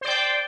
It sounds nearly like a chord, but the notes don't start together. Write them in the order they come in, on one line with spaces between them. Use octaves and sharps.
C5 D5 G5